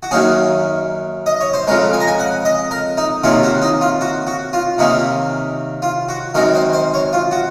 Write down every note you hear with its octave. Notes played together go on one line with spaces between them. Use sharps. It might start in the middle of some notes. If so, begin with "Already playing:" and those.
F#4
F#2 D#3 A#3 C#4 G#4
D#5
C#5
C5
F2 C#3 G#3 A#4
G#5
A#5
G#5
F#5
D#5
A#4
D#4
C3 D#3 A#3 C#4 F4
F#4
D#4
F4
F#4
F#4
F4
C3 D#3 A#3 C#4 D#4
F4
F#4
F#2 D#3 G#3 C4 A#4
C5
C5
C#5
F4
F#4